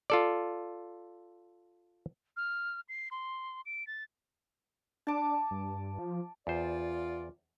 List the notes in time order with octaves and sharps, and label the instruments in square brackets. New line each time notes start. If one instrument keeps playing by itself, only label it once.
[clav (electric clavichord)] F4 A4 D5
[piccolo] F6
C7
C6
D7
A6
[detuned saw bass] D4 [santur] A5 D6
[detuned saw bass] G2
F3
[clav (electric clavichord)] E2 C5 [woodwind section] F4 D5